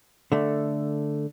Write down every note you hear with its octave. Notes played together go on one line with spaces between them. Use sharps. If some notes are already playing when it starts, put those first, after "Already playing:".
D3 A3